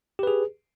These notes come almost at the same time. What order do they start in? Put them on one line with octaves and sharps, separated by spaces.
G4 B4 G#4